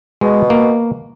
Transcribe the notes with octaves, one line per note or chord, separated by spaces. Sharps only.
B2 G#3
A#3